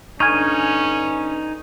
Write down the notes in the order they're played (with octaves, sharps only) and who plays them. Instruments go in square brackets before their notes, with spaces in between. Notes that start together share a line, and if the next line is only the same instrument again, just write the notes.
[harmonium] G2 D3 [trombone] C#4 [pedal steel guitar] D#4 G#5 [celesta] C#6 F6 G#6